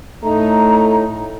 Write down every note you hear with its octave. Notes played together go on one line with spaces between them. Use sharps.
A2 A3 D#4 A#5